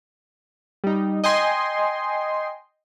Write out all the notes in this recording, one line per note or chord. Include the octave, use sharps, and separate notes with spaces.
G3 D#4
D#5 G5 G#5 C6